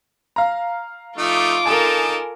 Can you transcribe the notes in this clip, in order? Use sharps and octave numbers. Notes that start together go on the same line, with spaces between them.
F5 A#5
F3 A3 D#4 F4 D6
D#4 A4 A#4 G#5 A5